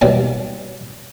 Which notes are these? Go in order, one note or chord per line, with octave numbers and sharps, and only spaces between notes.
B2 D#3 F#3 G3 A#3